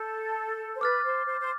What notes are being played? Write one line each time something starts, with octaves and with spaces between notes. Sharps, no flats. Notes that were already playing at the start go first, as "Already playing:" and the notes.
Already playing: A4 G6
C5
B4 D6 F6 A6
C5
C5
C5